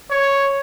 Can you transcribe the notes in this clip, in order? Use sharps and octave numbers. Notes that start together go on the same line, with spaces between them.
C#5